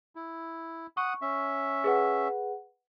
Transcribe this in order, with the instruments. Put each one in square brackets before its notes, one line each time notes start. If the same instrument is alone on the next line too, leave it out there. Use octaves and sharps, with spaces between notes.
[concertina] E4
[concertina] F#5 D#6 [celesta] C#6
[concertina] C#4 E5
[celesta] G#4 B4 F#5